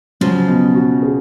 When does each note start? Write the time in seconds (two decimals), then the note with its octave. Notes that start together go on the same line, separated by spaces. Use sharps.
0.21 C#3 F3 F#3
0.48 B2
0.75 F#4
1.03 G#4